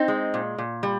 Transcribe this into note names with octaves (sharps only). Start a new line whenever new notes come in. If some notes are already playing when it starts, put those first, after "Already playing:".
Already playing: C4 D#4
G#3
A#2
A#2
G3